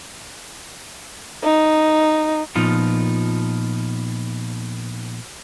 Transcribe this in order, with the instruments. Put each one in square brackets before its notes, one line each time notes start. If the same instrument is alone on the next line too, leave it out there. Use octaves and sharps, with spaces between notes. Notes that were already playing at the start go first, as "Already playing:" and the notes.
[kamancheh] D#4
[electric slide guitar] A#2 F3 B3 D#4 F4